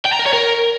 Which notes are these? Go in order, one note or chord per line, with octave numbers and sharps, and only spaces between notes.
G5
A#5
A#4
C#5
A#4